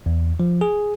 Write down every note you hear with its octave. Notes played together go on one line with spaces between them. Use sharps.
E2
F3
G#4